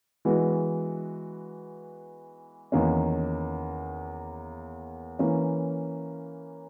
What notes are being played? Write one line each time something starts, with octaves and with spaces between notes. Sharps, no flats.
E3 G#3 B3 F#4
E2 D#3 A#3 C#4
E3 A#3 C#4